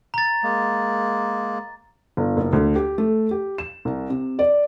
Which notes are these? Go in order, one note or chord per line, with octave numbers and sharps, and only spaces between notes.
A#5 A6
G#3 A#3
G1
F#1
D2
G4
A3
G4
E7
C2
C3
D5